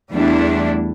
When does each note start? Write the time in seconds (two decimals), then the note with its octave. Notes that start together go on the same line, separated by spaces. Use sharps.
0.12 E2 G3 A3 D4 E4